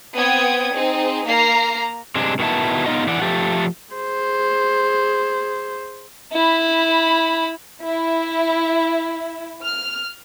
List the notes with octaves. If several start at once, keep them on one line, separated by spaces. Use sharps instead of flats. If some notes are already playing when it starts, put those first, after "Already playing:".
B3 C4 G5 D#6 G#6
C4 D#4 G#4
A#3 A#4 A#5 C7
C3 G#3 D4
B2 D#3 B3 E4 A5
B3 D#4 F4 D#5
E3 D5 F#5
F3 A3 G4 A4
G#4 C5
E4 B5
E4
F6